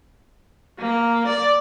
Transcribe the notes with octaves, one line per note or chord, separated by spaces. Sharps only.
A#3
D5